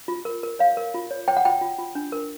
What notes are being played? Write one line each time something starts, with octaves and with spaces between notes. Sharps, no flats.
F4
A#4
A#4
C#5 F5
A#4
F4
C#5
C#5 G5
F#5
F4 G5
F4
F4
D4
A#4